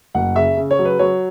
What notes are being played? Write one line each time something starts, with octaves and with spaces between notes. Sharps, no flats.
F#1 F#5
C#3 E5
C#3
C#5
F#3
B4
F#3 C#5